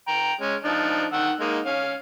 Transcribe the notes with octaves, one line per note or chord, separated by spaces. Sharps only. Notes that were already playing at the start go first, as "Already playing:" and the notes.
G5 A#5
G#3 C#4
F3 D4 D#4
D#3 F#5 E6
G#3 A#3 D#4
C#4 F5